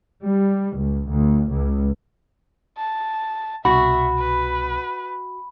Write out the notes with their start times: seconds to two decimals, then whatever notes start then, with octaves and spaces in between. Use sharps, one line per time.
0.22 G3
0.77 C#2
1.10 D2
1.51 C#2
2.77 A5
3.65 C2 B2 F#4 E5 B5
4.19 B4